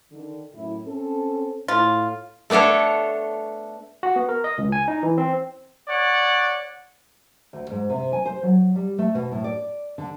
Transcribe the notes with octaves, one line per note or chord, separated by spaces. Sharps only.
D3 D#3
F#2 A2 E4
C4 C#4 A4
A2 F4
A3 B3 D4 A4 C#5
F#4
B3
A#4
D#5
C#2
G#5
D#4
E3
C4
C#5 D5 F#5
D2
G#2
C3
G#5
C5
F#3
G3
A3
B2
A2
D5
D3